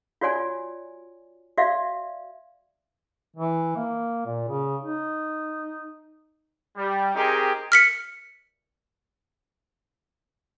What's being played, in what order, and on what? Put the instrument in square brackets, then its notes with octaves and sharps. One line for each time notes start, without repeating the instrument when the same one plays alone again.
[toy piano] F4 F#4 C#5 D5 G#5
F#4 D5 E5 F5
[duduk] E3
A#3
A#2
C#3
D#4
[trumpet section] G3
C4 D#4 G4 G#4 A#4
[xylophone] F6 B6 C#7